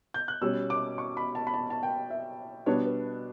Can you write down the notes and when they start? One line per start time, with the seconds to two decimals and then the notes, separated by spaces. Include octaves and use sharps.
0.14 G6
0.28 F#6
0.41 B2 G3 C#4 E6
0.70 D6
0.98 C#6
1.17 B5
1.35 A5
1.47 B5
1.54 A5
1.70 A5
1.83 G5
2.10 E5
2.66 B2 G3 B3 D4 C#5
2.86 B4